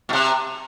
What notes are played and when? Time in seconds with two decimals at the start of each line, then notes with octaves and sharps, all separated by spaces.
0.09 B2
0.13 C3